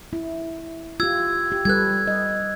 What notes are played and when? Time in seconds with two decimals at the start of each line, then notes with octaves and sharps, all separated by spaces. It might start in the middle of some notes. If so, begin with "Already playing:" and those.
0.13 E4
1.00 F4 G4 E6 G#6
1.52 G4
1.65 G3 A4 B4 F#6 G#6
2.07 D#5